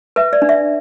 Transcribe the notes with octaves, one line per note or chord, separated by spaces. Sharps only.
B4 E5
D5
D4
E5